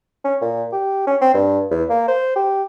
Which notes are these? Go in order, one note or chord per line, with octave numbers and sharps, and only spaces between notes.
C#4
A#2
G4
C#4
C4
G2
E2
A#3
C5
G4